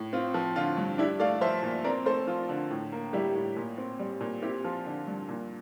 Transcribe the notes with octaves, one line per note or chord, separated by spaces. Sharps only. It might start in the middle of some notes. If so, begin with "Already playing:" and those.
Already playing: A2
C4 F4
F3
D3 F4
G2
D4 E4 G4
A3 D5 F5
F3 C5 E5
A#2
C4 A#4 D5
A3 A4 C5
F3 F4
D3
A2
A#3
G3 E4 G4
A2
A#2
C4
G3
A#2
C4 E4 G4
F3 F4
D3
G2
A#2